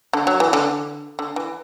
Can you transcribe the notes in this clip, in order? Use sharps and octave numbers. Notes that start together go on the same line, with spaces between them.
D3
F#3
E3
D3
D3
E3